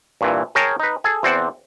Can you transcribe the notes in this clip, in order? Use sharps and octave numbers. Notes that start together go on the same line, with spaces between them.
G2 A#2 E3
G#4 A#4 C#5 G5 A5 A#5
D#4 B4
G#4 A4 G#5
E2 C4 C5 D5 F#5